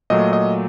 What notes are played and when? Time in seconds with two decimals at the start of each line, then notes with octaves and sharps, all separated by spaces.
0.10 A#2 F#3 A3 D#5
0.33 D#5